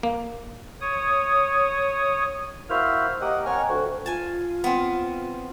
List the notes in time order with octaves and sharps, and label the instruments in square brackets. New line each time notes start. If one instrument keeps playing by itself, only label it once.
[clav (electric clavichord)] A#3
[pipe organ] C#5 D#6
[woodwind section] A#3 C5 F6 [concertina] E4 F#4
[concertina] A#3 F#5 [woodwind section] G4 D#5
[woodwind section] C4 F#5 G#5 [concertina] A#4 C#5 F6
[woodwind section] D2 [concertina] F#4
[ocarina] F4 [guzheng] G#5 A5
[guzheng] B3 C4